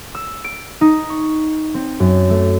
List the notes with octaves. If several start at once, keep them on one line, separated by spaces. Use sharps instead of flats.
E6
D7
D#4
C#6
C4
F#2
A3